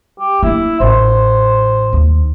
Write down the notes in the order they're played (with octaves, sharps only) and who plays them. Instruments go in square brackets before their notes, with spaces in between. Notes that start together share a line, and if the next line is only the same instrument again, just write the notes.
[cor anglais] G4
[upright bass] A#3 D4 [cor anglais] E4
[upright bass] A1 [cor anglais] C5
[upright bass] D#2